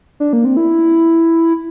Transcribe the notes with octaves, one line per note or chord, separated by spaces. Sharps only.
D4
A#3
C4
E4